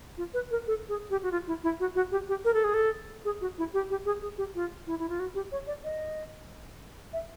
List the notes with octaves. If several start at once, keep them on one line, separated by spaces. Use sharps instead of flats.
F4
B4
A#4
A4
G#4
G4
F#4
F4
E4
E4
F#4
F#4
G4
G4
A#4
A4
G#4
A4
G#4
F#4
E4
G4
G4
G#4
G#4
G4
F4
E4
E4
F4
F#4
G4
C#5
D5
D#5
E5